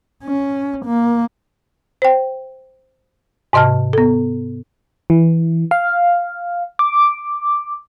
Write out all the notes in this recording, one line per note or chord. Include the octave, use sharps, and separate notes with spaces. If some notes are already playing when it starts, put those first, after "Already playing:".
C#4
A#3
C5 G5
G#2 C3 D#5 A5 F6
B3 A4
E3
F5
D6